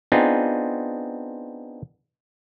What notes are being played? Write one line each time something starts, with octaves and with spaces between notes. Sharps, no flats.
B3 C4 D4 D#4 F4 G#4